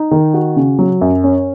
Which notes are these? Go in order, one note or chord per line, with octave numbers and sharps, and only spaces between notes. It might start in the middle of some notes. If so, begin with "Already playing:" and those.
Already playing: D#4
D#3
F#4
C#3
F#3
F#2
C#4